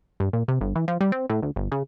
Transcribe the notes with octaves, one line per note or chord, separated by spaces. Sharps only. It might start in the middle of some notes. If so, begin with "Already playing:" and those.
G2
A#2
C3
G1
E3
F3
G3
C4
A2
D2
G1
C#3